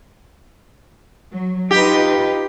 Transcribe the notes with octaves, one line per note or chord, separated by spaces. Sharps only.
F#3
D#4 F4 G4 B4